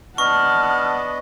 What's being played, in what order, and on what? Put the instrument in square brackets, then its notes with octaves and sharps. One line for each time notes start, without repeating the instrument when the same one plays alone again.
[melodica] B3 D4 D#5 [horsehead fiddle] F#5 A5 [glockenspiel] C#6 [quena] F6